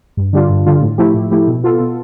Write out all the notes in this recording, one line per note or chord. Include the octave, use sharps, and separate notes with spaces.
G2
D3 G3 D4 F4
G2
D3 G3 D4 F4
A2
F3 A3 E4 G4
A2
F3 A3 E4 G4
B2
B3 F4 A4
B2